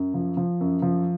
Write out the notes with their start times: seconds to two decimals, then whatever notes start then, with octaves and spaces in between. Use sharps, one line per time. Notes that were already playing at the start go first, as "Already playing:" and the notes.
Already playing: F#2
0.14 F3
0.37 F3
0.60 F#2
0.82 F3